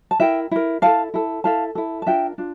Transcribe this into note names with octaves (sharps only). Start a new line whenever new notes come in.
A5
E4 A#4 E5 G5
E4 A#4
E4 A4 F5 A5
E4 A4
E4 A4 F5 A5
E4 A4
A5
D4 F4 A#4 E5 G5
D4 F4